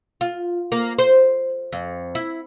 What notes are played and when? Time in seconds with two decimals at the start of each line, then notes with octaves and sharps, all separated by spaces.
0.21 F4
0.72 A#3
0.98 C5
1.72 F2
2.15 E4